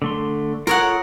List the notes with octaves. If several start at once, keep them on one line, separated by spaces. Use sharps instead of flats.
D3 A3 C6
F4 A4 A#4 C#5 F#5 D#6